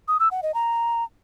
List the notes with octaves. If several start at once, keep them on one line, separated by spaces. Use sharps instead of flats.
D#6
E6
F#5
D#5
A#5